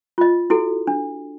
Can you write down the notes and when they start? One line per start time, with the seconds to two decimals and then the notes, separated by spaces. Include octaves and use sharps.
0.18 F4 D#5
0.50 E4 F#4 A4
0.87 D4